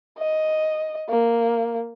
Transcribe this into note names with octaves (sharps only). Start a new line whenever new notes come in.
D#5
A#3